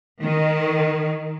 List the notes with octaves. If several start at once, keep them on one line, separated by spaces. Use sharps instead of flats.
D#3